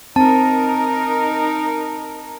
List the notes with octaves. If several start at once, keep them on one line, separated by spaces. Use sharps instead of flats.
C4 D#4 A#4 A5